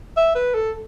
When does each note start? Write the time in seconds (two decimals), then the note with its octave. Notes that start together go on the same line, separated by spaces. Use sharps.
0.17 E5
0.35 B4
0.55 A4